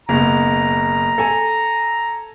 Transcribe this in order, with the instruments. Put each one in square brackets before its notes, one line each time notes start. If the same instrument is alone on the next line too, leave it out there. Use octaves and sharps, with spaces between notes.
[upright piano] F#1 B2 [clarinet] A#5
[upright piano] A4 G#5